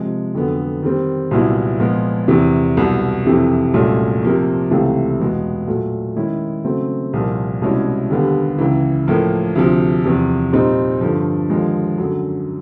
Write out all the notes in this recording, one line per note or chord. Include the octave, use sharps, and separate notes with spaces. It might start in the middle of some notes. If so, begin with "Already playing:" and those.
Already playing: C3 F3 G#3
F2 D3 F#3 B3
D#3 G3 C4
C2 A#2 F#3 B3 E4
A#2 F3 G#3 B3
E2 C3 E3
C2 B2 F#3
F2 C3 E3
C2 A#2 F#3 A3 C#4
C3 F3 A#3
C#2 C3 E3 A3
E2 B2 G#3 B3
A#2 F#3 A3
D#3 G#3 C#4 E4
C#3 F#3 A3 C4
C2 A#2 F3 A#3
C2 B2 G#3 C#4 E4
D#2 D3 G3 B3
C#2 C#3 E3
A2 F3 A#3
D2 C3 F3
E2 C3 F3
A#2 G3 C4 D#4
G2 D3 F3
D#2 D3 F3 G#3
F#2 D3 F#3